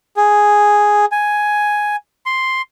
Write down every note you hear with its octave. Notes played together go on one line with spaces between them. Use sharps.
G#4
G#5
C6